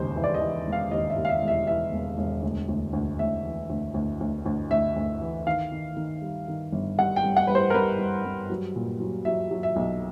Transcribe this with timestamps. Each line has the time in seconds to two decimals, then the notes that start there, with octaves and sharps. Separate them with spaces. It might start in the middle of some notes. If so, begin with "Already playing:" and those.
Already playing: E1 D#2 C#3 C5
0.16 E3
0.24 D5
0.34 D#5
0.41 E3
0.67 E1
0.72 F5
0.91 D#2 D#5
1.10 E5
1.16 D#2
1.25 F5
1.29 E5
1.42 E1
1.48 E5
1.67 E3 E5
1.92 E1
2.18 E1
2.42 D2
2.68 D2
2.93 D2
3.19 D2 E5
3.44 E3
3.70 D2
3.94 D2
4.21 D2
4.46 D2
4.70 D2 E5
4.96 D2
5.21 E3
5.47 D#3 F5
5.72 D#3
5.97 D#3
6.22 G3
6.48 D#3
6.72 G1
6.98 G2 F#5
7.16 G5
7.24 G2
7.37 F#5
7.47 G2 B4
7.55 C5
7.70 A#4
7.74 G2 B4
7.99 G3
8.25 G2
8.50 F#3
8.76 A#2
9.00 F#3
9.25 F#3 E5
9.51 F#3
9.63 E5
9.76 B1